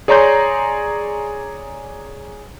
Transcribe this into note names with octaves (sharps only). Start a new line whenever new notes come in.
G#4 C#5 D5 A#5 C6 G6